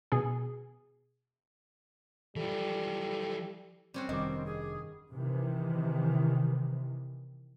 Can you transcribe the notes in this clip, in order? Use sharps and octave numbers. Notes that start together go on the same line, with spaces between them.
B2 G#4
E3 F3 G3 A4
G3 C4 C#4 F#4
F1 G2 D#3 G3 D#5 D6
G#4
C3 D#3 E3